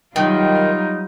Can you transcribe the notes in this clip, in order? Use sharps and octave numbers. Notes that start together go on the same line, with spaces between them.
D#3 F#3 G3 D#4 F4